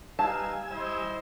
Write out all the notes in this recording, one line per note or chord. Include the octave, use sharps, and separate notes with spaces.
G3 D#4 B4 F5 G#5 A5 E6
E4 C5 D#5